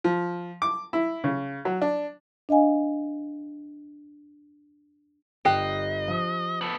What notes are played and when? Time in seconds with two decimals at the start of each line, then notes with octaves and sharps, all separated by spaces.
0.04 F3
0.62 D6
0.93 E4
1.24 C#3
1.65 F#3
1.82 D4
2.49 D4 D#5 F5 G#5
5.45 G1 G4 D#5 F#6 C7
6.08 F3 D#6
6.61 B3 A4